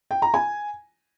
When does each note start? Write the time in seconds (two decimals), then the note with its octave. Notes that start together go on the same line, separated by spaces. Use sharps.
0.11 G5
0.22 A#5
0.34 G#5